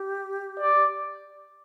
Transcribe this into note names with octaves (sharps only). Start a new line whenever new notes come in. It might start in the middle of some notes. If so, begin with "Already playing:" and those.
Already playing: G4
D5